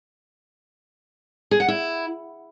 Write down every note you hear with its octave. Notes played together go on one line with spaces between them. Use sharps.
G#4
F#5
E4